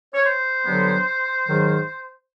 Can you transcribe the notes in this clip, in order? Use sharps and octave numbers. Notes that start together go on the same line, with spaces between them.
C#5
C5
G2 D3 F#3 B3
G#2 D#3 F#3